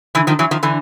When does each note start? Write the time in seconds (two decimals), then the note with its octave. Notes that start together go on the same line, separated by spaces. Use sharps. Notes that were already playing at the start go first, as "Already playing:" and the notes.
0.15 D3 E3
0.27 D#3 F3
0.39 E3 F#3
0.51 D#3 F3
0.63 D3 E3